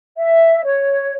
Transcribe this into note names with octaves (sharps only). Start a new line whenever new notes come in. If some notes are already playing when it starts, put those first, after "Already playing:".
E5
C#5